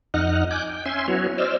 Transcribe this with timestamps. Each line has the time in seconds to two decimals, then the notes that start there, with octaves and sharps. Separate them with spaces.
0.14 F2 D#4 D#5 F#5 F6 F#6
0.51 G#5 D6 F#6 G6
0.69 G5
0.86 C#4 E5 G#5 C6
1.08 F#3 B3 E4 F#4 C#5
1.38 C5 D5 D#5 E6 F6